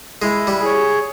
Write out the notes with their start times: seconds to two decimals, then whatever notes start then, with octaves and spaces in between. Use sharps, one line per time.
0.22 G#3 E4
0.47 G3
0.60 G#4 C#5